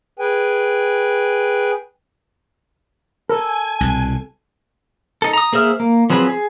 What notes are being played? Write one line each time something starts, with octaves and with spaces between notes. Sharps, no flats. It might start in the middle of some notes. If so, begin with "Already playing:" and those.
G#4 B4 G5 G#5
A4 A#4 G#5
C2 B2
D#4 A4
A#5 D#6
A#3 G#4 C5 E5 F6
A#3
F3 F#3 C4 G#4 B4
G#4